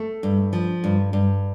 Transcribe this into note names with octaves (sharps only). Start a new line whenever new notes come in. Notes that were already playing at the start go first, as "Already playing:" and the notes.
Already playing: A3 A4
G2
F3
G2
G2